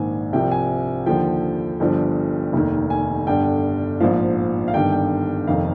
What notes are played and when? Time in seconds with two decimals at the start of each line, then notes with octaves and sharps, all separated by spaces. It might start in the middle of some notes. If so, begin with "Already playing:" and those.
Already playing: A#1 G#2 D#3 G#5
0.33 C2 C3 F3 G5
0.52 G#5
1.06 D#2 D3 F3 G5
1.80 G1 G2 F3
2.53 F1 D#2 D#3
2.90 G#5
3.27 G1 G2 D3 G5
4.00 A#1 G#2 F3 F5
4.68 F5
4.74 G1 G2 D#3 G5
4.92 G5
5.47 F1 F2 D#3 F5